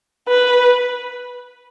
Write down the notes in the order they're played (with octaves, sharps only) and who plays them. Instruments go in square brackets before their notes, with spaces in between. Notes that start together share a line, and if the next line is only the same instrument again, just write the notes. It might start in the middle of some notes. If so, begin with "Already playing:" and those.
[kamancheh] B4